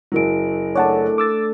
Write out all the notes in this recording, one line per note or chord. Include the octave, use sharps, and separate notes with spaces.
F#1 F#3 E4 A#4 D7
A3 D4 C#5 F#5 A5
D6 E6 A6